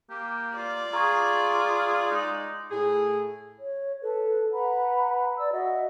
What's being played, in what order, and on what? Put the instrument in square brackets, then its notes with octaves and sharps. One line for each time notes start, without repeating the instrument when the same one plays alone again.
[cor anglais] A#3 [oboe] G4
[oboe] F4 [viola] D5
[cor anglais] F4 [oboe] G#4 [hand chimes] A#5 C#6 G#6
[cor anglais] G#3 [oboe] D#4
[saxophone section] A2 G#4
[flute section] C#5
A4 B4
B4 F#5 A#5 B5
D5 E6
F#4 D#5 E5 F#5